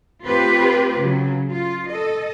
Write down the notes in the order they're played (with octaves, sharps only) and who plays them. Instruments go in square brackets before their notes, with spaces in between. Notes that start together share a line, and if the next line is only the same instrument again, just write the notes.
[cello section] A3 C4 F4 G4 B4
C#3 F#3
F4
A4 D#5